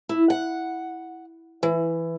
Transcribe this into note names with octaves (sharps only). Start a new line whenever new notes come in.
E4
F#5
E3